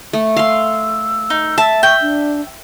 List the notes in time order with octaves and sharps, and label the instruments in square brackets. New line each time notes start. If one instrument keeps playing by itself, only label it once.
[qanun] A3
[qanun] F5 C6 [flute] E6
[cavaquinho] D#4
[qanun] E5 [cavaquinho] A5
[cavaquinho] G5 [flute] C#6
[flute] D4